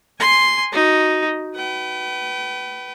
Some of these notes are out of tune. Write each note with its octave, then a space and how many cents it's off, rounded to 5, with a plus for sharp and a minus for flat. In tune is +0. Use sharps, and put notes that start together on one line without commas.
G#5 +0 C6 +0
D#4 +0 F#4 +0
B4 +0 G5 -45